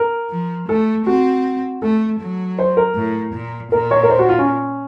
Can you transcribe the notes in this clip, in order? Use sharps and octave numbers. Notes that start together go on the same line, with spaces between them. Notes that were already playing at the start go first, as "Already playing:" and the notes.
Already playing: A#4
F3
A3 A4
C4 F#4
A3 A4
F#3
C5
A#4
A2
A#2
A#2 A#4
C#5
A#4
C5
F#4
F4
C#4